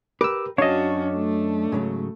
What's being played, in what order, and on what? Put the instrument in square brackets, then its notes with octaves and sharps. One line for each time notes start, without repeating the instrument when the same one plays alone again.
[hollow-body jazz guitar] G4 A#4 B4 [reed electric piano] D6 E6
[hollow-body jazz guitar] F#2 F5 [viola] C#4 F#4 [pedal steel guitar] D4 A5 [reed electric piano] C#5 D#5
[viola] A3
[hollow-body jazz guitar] G#2 C#3 F#3